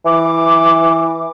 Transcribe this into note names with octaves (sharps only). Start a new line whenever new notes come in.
E3 D6